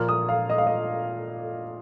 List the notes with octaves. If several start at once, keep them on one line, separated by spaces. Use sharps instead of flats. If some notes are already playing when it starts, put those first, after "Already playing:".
Already playing: A#2 F3 A#3 F6
D#6
F5
D#5
F5
D#5